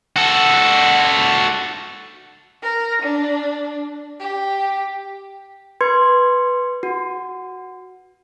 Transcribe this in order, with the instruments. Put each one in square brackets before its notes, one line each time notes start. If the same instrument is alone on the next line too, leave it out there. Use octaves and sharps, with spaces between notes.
[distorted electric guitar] F#4 A4
[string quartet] A#4
D4
G4
[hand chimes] B4 C6 G#6 C#7
F#4